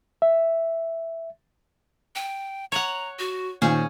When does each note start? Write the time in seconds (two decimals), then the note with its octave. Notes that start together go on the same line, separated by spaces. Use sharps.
0.22 E5
2.15 G5
2.72 C#5 F#5 A#5
3.19 F#4
3.62 A#2 D#3 C#4 G#4 C5